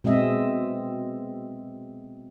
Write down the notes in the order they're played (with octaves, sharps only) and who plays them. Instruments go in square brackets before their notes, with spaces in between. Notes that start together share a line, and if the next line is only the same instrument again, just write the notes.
[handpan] B2 G#3 C4 D#5 E5